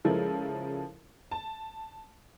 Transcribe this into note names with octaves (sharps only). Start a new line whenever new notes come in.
C#3 F3 G#3 E4 A4 A#4
A5